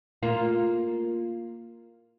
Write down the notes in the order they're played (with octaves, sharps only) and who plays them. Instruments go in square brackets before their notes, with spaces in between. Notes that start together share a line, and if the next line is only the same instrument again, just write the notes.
[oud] A#3 F4